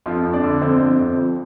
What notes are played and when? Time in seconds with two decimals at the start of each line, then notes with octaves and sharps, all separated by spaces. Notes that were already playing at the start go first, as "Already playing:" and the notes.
0.06 F2 F3 F4
0.24 F2
0.33 D4 D5
0.43 D3
0.61 F2 C4 C5
0.80 F2
0.99 F2
1.17 F3